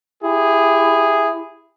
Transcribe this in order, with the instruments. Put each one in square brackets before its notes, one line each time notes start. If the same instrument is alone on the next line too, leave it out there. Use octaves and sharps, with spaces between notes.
[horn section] E4 G4 G#4